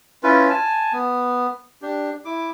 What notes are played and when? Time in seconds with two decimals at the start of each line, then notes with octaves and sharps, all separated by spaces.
0.23 C#4 E4 F4 B4
0.50 G#5 A5
0.93 B3
1.82 D4 G4
2.25 E4 D6